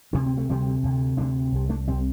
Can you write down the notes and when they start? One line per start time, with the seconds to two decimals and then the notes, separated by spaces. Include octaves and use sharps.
0.13 D2 C3 D4
0.26 C4
0.37 A3
0.49 D2 C3 G3 C4
0.83 D2 C3
1.17 D2 C3 A3 D4
1.52 C2 C3
1.69 A3 D4
1.87 C2 C3 G3 C4